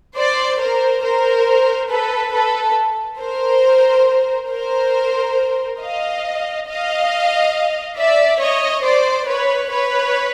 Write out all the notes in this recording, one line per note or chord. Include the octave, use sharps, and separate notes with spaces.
C5 D5
A#4 C5
A#4 C5
A4 B4
A4 B4
A#4 C5
A#4 C5
D#5 F5
D#5 F5
D5 E5
C#5 D#5
C5 D5
B4 C#5
B4 C#5